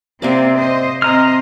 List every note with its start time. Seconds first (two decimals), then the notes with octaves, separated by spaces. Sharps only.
0.22 C3 A#3 C4 D5
0.58 C5 D#5
1.02 C4 C5 D#5 A#5 F6